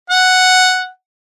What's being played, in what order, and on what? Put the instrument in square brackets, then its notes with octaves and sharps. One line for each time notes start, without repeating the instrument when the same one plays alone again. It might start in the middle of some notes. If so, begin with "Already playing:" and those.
[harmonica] F#5